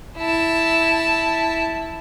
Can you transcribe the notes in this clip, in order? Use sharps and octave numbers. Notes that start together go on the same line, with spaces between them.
E4 A5